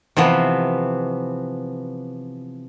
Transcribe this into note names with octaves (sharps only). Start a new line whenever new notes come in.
C3 E3 F3 B3